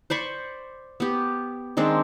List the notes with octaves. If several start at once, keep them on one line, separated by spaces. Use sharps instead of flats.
C5 D5 B5 C#6
B3 G4
D#3 G#3 C4 D4